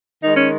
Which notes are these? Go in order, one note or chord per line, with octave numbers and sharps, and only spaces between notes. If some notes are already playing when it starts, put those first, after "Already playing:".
D#3 G#3 D#4
C#4